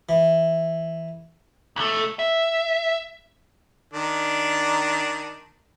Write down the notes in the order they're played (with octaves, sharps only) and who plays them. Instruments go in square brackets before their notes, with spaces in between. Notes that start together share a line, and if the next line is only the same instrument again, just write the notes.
[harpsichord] E3
[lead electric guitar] B1 A3
E5
[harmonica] D#3 D4